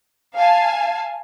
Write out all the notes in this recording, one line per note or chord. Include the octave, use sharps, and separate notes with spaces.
F5 G#5 A5